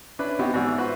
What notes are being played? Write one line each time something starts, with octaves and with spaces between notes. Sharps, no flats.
C#4 D4 E4 B4
B3 C4 D#4 E4 F#4 G4
A1 G#2 B3 F#4 D5 E6
F4 F#4 B4 C5 E5